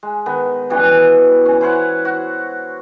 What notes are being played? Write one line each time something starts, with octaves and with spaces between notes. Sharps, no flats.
G#3
D#3 B3
B2 E3 G3 C#4
C#4
E4 C5 C#5 F#5
F#4